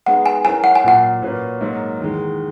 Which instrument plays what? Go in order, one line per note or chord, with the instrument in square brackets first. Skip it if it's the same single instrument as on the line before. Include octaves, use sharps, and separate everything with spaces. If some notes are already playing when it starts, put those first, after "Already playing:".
[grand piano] G#3 B3 D#4 G#4 [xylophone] F#5
[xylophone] G#5
[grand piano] F#3 C#4 E4 A#4 [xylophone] G#5
[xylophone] F#5
G#5
[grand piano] A#2 F#3 A#3 [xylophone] F#5
[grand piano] A#2 A#3 C#4 F#4 B4
G#2 F#3 A#3
E2 D#3 G#3